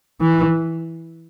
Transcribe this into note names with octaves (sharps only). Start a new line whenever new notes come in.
E3